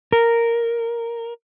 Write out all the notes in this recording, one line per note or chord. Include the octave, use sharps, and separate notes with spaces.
A#4